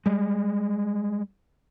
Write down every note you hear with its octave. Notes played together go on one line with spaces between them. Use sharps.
G3 G#3